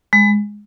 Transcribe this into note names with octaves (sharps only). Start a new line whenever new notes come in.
G#3